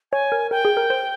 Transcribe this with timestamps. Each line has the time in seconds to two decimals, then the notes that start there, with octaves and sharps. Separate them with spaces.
0.12 C#5 G#5
0.32 A#4
0.51 A#4 G5
0.65 G#4
0.77 A#4
0.90 C5